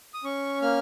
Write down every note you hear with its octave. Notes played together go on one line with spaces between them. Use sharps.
D#6
C#4 C#6
A#3 F6